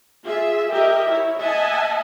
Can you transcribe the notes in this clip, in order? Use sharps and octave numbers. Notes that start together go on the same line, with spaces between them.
F4 G#4 E5
G4 A#4 D#5 E5
E4 C#5
D#5 E5 F#5 G#5 A5